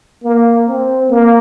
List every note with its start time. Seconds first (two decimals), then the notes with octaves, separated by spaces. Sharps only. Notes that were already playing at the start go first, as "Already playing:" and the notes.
0.23 A#3
0.68 C4
1.10 A#3